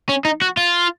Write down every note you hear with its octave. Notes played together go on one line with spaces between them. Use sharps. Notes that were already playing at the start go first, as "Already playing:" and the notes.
C#4
D#4
F#4
F4